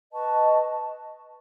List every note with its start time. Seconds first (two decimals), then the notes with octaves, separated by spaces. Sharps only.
0.11 B4 D#5 A5 C#6